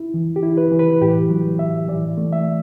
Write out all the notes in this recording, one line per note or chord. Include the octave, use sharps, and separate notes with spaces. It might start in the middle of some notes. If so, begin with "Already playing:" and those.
Already playing: E4
E3
G4
E4
B4
E3
B4
A2 G4
F#3
A2 E5
E3 D5
A3
E5